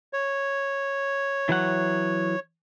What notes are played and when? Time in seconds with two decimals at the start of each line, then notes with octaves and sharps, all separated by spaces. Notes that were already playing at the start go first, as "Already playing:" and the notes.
0.13 C#5
1.49 E3 F#3 F#5